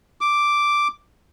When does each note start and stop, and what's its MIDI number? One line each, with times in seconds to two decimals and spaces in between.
0.21 0.88 86